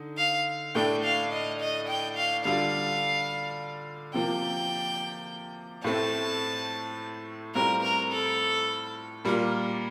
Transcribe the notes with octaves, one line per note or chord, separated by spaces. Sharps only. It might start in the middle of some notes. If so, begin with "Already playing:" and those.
Already playing: D3 D#4
F5
A2 A3 D4 G5
F5
D#5
D#5
G5
F5
D3 G3 D4 F4 F5
C3 F3 A#3 G5
A2 A3 C4 A5
A2 G3 C4 F4 A#4
A#4
A4
A#2 G3 A#3 F4